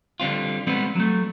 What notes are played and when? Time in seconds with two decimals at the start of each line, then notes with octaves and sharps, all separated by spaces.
0.20 D3 G3 C4 F4
0.67 G3 G#3 B3 C4
0.96 F#3 A3